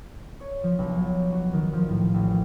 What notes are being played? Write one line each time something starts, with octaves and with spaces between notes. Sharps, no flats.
C#5
F3
B1
F#3
F#4
D#3
F3
A2
A1